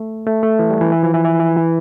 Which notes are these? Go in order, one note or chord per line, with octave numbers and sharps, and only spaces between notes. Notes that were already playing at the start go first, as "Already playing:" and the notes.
Already playing: A3
A3
A3
E3
G3
E3
E3
F3
E3
E3
E3
E3